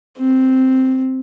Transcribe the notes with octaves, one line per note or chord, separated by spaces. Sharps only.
C4